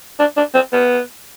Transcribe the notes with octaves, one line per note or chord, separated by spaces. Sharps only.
D4
D4
C4
B3